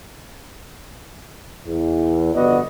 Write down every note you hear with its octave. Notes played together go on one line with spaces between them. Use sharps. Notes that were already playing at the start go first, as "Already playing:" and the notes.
E2
G1 F2 B3 F#4 D5 D#5